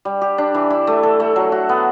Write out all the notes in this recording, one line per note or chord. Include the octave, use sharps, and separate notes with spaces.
G3
G4
D4
E3
E4
A3
A4
A3
F#3
F#4
B3